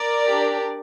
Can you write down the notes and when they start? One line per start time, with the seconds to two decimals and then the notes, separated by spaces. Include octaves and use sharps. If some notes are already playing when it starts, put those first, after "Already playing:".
Already playing: A#4 D5
0.30 D4 G4